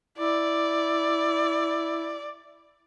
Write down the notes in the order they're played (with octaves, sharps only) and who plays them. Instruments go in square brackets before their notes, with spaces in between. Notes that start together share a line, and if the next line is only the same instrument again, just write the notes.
[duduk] E4 [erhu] D5